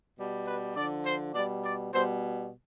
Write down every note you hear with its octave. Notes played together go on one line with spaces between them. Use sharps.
B2 G3
B4
D3 F3 D5
C5
B2 G3 D5
D5
B2 G3 C5